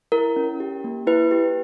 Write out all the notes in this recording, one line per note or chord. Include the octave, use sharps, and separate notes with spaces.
E4 A#4
C#4
G4
A#3
E4 B4
G4